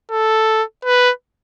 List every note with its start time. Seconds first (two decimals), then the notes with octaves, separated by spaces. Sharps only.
0.11 A4
0.85 B4